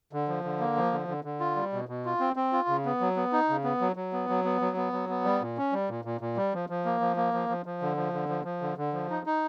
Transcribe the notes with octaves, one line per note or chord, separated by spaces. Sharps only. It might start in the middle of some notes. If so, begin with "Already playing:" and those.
D3
F3
D3
A#3
F3
D3
D3
D3
F4
G3
B2
B2
F4
C4
C4
F4
C#3
B3
F#3
B3
D#4
C#3
B3
F#3
F#3
B3
F#3
B3
F#3
B3
F#3
B3
G3
A#2
C#4
G3
A#2
A#2
A#2
G3
F3
F3
A#3
F3
A#3
F3
F3
F3
D3
F3
D3
F3
F3
D3
D3
F3
D#4
D#4